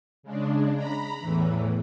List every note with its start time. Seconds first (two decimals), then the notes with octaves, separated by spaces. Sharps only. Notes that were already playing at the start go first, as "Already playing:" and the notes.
0.23 C#3 G#3 D4
0.75 A#5 B5
1.20 E2 A2 E3